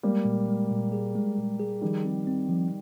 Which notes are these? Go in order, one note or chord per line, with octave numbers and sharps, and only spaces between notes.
G3 G#3 A#3
A#2
G#3
A#2
G#4
G#3
A#2
G#4
D#3 F3 G3
C4
C4
F3